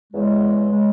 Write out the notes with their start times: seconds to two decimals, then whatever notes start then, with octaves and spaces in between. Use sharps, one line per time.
0.13 E2 C#3 G#3
0.70 C#3 G#3